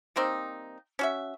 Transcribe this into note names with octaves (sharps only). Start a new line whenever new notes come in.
G3 A#3 C4 D#4
C#4 F#4 E5